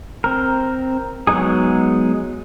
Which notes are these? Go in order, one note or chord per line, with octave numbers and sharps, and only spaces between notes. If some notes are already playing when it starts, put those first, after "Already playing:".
C4 A#4
F#3 G#3 B3 D#4 G#4